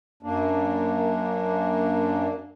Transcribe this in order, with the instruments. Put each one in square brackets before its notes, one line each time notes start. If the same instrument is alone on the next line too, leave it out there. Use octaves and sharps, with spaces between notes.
[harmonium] F#2 A#3 D4